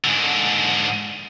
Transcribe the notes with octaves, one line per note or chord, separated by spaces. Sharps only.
G#2 D3